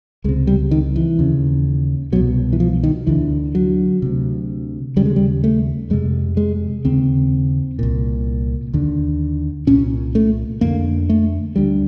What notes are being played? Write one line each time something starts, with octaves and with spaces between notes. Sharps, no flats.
C#2 C3 G#3
G3
D#3
E3
D#2 C#3
C2 B2 F#3
E3
F3
D#3
D2 D3 E3
F#3
D2 C3
D#2 C#3 G3
G#3
G3
A3
F2 C3 G#3
G#3
D#2 C#3 C4
C2 A#2
D#2 D3
C2 A#2 C#4
A3
F2 D3 A#3
A3
D2 D3 G3